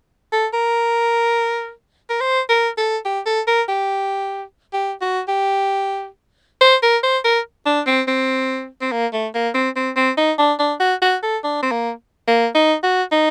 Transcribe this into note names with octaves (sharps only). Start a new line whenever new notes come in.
A4
A#4
A#4
C5
A#4
A4
G4
A4
A#4
G4
G4
F#4
G4
C5
A#4
C5
A#4
D4
C4
C4
C4
A#3
A3
A#3
C4
C4
C4
D#4
D4
D4
F#4
F#4
A4
D4
C4
A#3
A#3
D#4
F#4
D#4